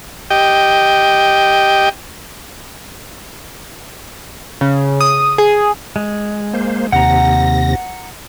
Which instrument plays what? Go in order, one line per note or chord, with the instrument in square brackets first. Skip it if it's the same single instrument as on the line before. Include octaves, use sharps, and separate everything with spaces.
[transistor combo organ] G4 D#5 G5
[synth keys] C#3
D#6
G#4
[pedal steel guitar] G#3
[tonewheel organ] A#3 C5
[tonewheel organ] D#2 C3 A#6 [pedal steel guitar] F#5 A#5